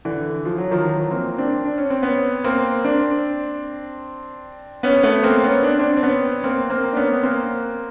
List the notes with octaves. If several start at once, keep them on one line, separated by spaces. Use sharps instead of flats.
D3 E3
F3
F#3
D#3 F3
E3 F#3
A#3 C4
C4 D4
D4
C#4
C4
B3 C#4
A#3 C4
C4 D4
B3 C#4
A3 B3
A#3 C4
B3 C#4
D4
C4 D4
C4
B3 C#4
A#3 C4
A#3 C4
D4
B3 C#4
B3
A#3 C4